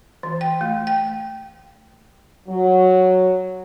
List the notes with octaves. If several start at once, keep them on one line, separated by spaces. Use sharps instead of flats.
E3
G5
A3
G5
F#3